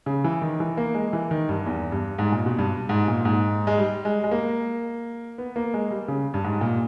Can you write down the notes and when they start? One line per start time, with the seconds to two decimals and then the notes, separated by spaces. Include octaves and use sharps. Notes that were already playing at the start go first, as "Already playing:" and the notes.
0.06 C#3
0.24 E3
0.42 D#3
0.60 E3
0.77 A#3
0.94 G#3
1.13 E3
1.31 D#3
1.49 G2
1.66 E2
1.92 G2
2.19 G#2
2.32 A#2
2.46 B2
2.58 G2
2.89 G#2
3.08 A#2
3.25 G#2
3.67 G#3
3.78 G3
4.05 G#3
4.24 G#3
4.31 A#3
5.38 B3
5.56 A#3
5.74 G#3
5.91 G3
6.08 C#3
6.34 G2
6.44 G#2
6.61 A#2